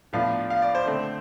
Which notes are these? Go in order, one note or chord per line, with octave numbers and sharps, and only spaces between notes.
A2 F3 B3 D4 F5
F5
D5
C5
D3 A3 C4